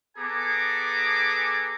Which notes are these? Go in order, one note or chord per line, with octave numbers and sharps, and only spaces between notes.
B3 G#4 A4 G#5 A#5 D6